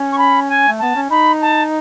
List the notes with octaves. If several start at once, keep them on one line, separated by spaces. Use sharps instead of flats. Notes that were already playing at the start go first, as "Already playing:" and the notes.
Already playing: C#4
C#6
B5
G#5
A3
B3 A5
C#4
D#4 B5
A5